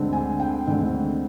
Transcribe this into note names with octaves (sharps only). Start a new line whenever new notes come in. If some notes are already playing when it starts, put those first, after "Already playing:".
Already playing: D2 D3 G#3 C4
G#5
G5
D2 D3 G#3 C4